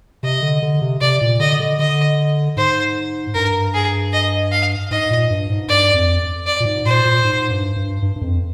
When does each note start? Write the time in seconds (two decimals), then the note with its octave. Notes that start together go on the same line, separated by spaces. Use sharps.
0.23 C3 D#5
0.42 D3
0.62 D3
0.82 C3
1.01 C3 D5
1.21 A#2
1.40 D3 D#5
1.60 D3
1.79 D3 D#5
2.57 G#2 C5
3.34 G2 A#4
3.74 G#4
4.13 D#5
4.52 F5
4.91 G#2 D#5
5.11 A#2
5.30 G2
5.50 G#2
5.68 G2 D5
5.94 F2
6.46 D5
6.60 A#2
6.66 G#2
6.86 A#2 C5
7.05 A#2
7.24 G#2
7.50 G2
7.76 G2
8.02 G2
8.16 G2
8.22 F2